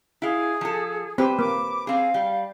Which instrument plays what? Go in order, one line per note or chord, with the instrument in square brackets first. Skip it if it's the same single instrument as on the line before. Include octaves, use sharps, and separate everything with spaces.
[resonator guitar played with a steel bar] E4 F5 [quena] G#4
[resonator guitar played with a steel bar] F3 A4
[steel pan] C4 G4 [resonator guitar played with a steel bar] B4 C5
[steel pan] A#3 [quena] D6
[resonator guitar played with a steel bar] C4 G#4 [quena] F5
[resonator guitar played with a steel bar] G3